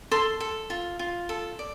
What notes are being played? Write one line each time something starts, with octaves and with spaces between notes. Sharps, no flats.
A4 C6
A4
F4
F4
A4
D5